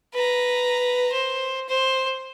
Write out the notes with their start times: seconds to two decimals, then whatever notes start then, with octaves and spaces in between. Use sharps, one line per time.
0.14 B4 A#5
1.12 C5
1.69 C5